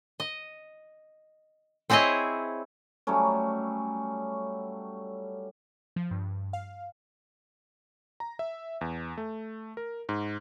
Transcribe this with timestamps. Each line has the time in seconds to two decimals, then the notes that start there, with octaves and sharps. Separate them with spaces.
0.20 D#5
1.90 C4 E4 G#4 C#5 D#5 E5
3.07 F#3 G3 A3 C#4
5.96 F3
6.11 G2
6.53 F5
8.20 A#5
8.39 E5
8.81 E2
9.17 A3
9.77 A#4
10.09 G#2